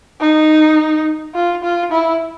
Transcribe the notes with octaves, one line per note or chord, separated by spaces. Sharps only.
D#4
F4
F4
E4